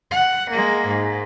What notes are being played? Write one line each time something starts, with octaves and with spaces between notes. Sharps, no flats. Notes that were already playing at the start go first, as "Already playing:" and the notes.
F#5
G#3 A#3
G#2